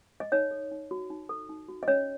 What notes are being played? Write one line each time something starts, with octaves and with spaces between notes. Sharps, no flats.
D#5
D#4 C#5
A4
D#4
F#4
D#4
A4
D#4
F#4
D#5
C#4 C#5